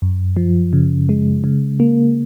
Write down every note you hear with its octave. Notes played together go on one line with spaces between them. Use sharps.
F#2
F3
C#3
G#3
C#3
A#3